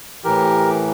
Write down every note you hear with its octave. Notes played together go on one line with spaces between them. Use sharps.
A2 E3 G4 A#4